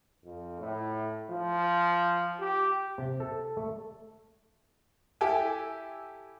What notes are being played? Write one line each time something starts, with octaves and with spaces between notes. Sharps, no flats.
F2
A2
F3
G4
C3
A4
A3
E4 G4 A4 G5 G#5